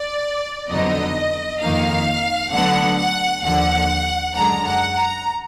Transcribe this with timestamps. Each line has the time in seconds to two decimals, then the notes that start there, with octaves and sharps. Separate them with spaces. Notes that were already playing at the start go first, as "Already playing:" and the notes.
Already playing: D5
0.70 F2 D3 F#3 B3 D#4 D#5
1.61 F2 D#3 A#3 D#4 F5
2.53 D2 D3 F#3 B3 D4 F#5
2.98 F#5
3.44 D#2 D3 F3 F#5
4.35 F#2 D3 G#3 D4 A#5
4.66 F#5
4.96 A#5